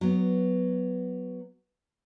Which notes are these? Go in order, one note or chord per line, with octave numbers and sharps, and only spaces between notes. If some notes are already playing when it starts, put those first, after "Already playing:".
F#3 B3